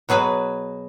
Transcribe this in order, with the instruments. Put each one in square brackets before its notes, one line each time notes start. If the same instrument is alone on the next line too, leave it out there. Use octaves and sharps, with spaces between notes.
[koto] B2 F#3 G#4 B4